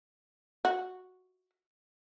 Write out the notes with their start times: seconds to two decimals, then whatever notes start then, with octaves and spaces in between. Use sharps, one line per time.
0.65 F#4